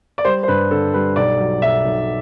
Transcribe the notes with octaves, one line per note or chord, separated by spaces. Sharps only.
D5
G3 C5
C5
G2 B4
D3 A4
G3 B4
B1 D5
F#3
B1 E5
B1